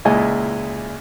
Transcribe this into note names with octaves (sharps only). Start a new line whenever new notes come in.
C#2 A#2 G#3 E4 D#5 G#5